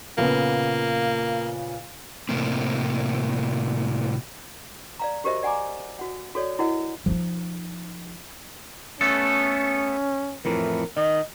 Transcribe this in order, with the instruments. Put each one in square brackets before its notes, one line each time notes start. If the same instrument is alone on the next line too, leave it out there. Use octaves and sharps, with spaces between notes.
[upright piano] A#2 C#3 B3 [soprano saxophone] A#3
[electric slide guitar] A2 C3 A#3 C4
[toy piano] D5 F5 A#5
F#4 G4 A#4 C5 D#5 E5
D5 F#5 G#5 A#5 D6
F#4 F#5
F#4 A4 C#5 D5
E4 F#4 A#4 D#5 F#5
[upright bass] F3 D#4
[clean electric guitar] A3 B3 A4 [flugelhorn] C#4
[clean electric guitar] F2 A2 E3 [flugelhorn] A#4
[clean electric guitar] D#3 [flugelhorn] D#5